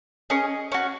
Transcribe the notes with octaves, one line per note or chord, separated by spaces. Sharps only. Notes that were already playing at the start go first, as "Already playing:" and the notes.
C#4 G#4 D#5
C#4 F#4